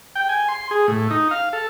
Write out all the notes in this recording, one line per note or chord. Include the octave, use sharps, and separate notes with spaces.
G5
G#5
C6
G#4
A2
D#4
F5
A4